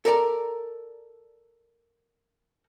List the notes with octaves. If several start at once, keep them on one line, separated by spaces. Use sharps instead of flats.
A4 A#4 D5 A#5